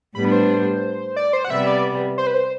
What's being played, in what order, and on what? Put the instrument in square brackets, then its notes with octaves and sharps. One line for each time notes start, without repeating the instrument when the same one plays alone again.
[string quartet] A2 G3 B3 D4 [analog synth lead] B5
[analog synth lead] B4
C5
D5
C5
F#5
[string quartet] C3 G3 B3 [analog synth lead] E5
[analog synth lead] D5
C5
B4
C5